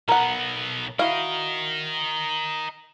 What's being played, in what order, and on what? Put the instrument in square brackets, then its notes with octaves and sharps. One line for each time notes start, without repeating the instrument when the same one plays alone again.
[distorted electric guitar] B1 B3 [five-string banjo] A#4 F#5
[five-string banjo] E4 F#4 F5 [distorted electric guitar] A#4 D#5